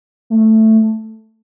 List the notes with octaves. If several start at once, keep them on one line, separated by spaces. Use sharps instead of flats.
A3